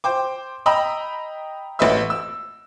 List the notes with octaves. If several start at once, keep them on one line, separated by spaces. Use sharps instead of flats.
C5 G5 D6
D#5 G5 A#5 B5 D#6 E6
A1 A3 B4 D#5 E5 E6
E6